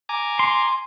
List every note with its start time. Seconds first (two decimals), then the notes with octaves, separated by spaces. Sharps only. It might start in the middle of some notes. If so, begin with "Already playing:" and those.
0.09 G#5 A#5 D6
0.39 C6